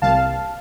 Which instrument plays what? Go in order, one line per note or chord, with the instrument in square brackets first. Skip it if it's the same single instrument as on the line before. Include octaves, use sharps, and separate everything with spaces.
[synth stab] C2 C3 G3 A#3 F5 A5